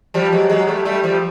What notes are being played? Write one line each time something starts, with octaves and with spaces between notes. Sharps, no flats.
F3 G3
F#3 G#3
F#3 G#3
G3 A3
G3 A3
F3 G3